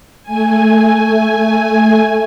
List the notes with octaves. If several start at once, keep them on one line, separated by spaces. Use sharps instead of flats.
A3 G#5